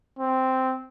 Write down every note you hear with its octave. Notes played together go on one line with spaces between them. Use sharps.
C4